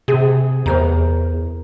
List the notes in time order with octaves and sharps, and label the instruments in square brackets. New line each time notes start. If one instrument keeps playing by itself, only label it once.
[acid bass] C3 [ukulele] G#4
[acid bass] E2 [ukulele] A#4 C5 A#5